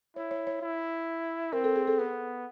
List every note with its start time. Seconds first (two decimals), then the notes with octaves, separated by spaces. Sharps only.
0.16 E4 C#5
0.31 C#5
0.47 C#5
0.62 E4
1.53 C4 A#4
1.64 A4
1.76 G#4
1.87 A4
1.98 B3 B4